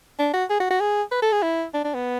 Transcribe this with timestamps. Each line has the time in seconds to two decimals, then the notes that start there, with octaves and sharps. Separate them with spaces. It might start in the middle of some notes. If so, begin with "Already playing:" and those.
0.19 D4
0.34 F#4
0.50 G#4
0.60 F#4
0.71 F#4
0.81 G#4
1.12 B4
1.22 A4
1.32 G#4
1.43 E4
1.74 D4
1.84 D4
1.95 B3